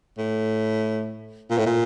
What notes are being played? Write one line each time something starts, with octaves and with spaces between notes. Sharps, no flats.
A2
A#2
A2
A#2